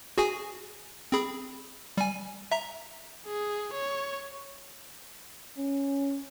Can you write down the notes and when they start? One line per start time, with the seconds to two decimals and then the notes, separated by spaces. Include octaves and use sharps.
0.18 F#4 G#4 G#5
1.12 C4 G#4 B5
1.97 G3 G#5
2.52 E5 A#5
3.26 G#4
3.74 C#5
5.57 C#4